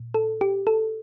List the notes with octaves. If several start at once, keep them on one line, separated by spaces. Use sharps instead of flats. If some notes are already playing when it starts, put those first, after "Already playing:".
Already playing: A#2
A4
G4
A4